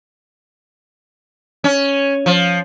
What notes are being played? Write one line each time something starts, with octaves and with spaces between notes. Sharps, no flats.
C#4
F3